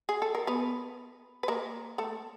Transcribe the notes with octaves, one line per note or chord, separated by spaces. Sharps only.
G#4
A4
A#4
B3 B4
B4
A#3 A#4
A3 A4